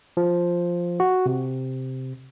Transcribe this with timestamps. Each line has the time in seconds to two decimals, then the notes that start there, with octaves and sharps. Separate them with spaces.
0.17 F3
1.00 F#4
1.26 C3